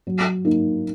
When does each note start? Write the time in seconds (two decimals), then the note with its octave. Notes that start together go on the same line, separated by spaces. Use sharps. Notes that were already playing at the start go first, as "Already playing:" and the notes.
0.07 F#3
0.45 A#3 D#4